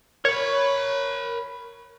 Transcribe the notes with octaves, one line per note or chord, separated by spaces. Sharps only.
A#4 C#5 B5